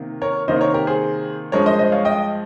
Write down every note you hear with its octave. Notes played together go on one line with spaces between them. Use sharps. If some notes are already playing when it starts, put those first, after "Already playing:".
Already playing: C3 D#3 A#3
A#4 C#5
C3 D#3 A#3 C5 D#5
A#4 C#5
G4 A#4
G#4 C5
G2 F3 G#3 A#4 C#5
C5 D#5
C5 D#5
C#5 F5
D#5 G5